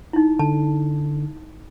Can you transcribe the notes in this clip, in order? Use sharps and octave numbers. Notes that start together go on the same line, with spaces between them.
D#4 E4
D3 A5